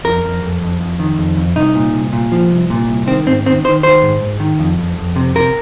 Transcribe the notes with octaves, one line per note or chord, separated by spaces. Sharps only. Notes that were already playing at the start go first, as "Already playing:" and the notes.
F2 A#4
F2
F2
F2
F2
D#3
F2
F2
C2 D#4
A#2
C2
A#2
F3
C2
A#2
C2
D#3 C4
G#2 C4
D#3 C4
D#3 C5
D#3 C5
G#2
G#2
D#3
F2
F2
F2
C3
C3 A#4